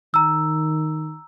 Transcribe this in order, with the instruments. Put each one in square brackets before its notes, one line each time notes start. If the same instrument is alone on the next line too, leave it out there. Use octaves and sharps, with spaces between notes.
[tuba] D#3 [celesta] A#5 E6